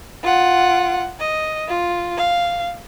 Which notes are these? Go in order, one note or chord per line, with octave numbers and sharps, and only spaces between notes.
F4 F#5
D#5
F4
F5